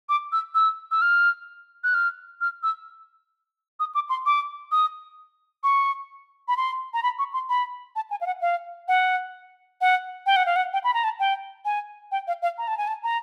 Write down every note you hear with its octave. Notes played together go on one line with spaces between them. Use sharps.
D6
E6
E6
E6
F6
F#6
F6
F6
E6
D#6
D6
C6
D6
D#6
C#6
B5
C6
A#5
B5
C#6
C6
B5
A5
G#5
F5
F#5
F5
F#5
F#5
G5
F#5
F5
F#5
G5
B5
A#5
A5
G5
G#5
G5
F5
F5
A#5
A5
G#5
A5
A#5